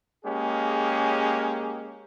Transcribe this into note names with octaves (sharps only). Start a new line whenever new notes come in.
G#3 A#3 C#4 G4 G#4